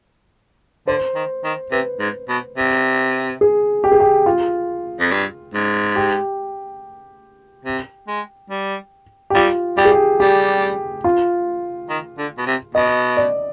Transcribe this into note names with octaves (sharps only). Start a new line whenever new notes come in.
D3 C5
D#3
D#3
C3 B4
G#2
B2
C3
G#4
G4
G#4
G4
F4
F2
G2
G#2
G4
C3
G#3
G3
G4
G3 F4
G3 G4
G#4
G4
G3 G4
F4
D#3
D3
B2
C3
B2 D#5
D5